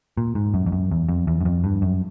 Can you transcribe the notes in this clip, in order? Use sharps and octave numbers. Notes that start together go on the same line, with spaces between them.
A#2
G#2
F#2
F2
F#2
E2
F2
E2
F#2
F2
G2
F#2